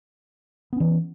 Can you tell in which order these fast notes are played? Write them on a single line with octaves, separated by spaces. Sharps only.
B3 C#4 E3